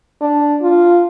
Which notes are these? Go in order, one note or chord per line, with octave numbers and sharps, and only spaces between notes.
D4
F4